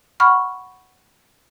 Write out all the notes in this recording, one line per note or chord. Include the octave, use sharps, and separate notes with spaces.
F#5 B5 C#6 F6